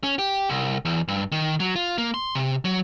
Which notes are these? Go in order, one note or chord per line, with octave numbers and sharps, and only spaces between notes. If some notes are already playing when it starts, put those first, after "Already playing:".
C#4
G4
C2
E2
G2
D#3
F#3
F4
A#3
C6
C3
F#3